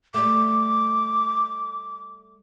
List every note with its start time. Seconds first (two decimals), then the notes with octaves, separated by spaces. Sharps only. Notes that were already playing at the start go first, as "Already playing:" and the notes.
0.14 G3 A3 D6